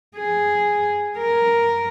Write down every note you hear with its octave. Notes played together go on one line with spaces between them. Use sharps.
G#4
A#4